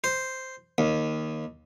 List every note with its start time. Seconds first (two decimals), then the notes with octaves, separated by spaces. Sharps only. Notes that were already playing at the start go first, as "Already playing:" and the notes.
0.04 C5
0.78 D#2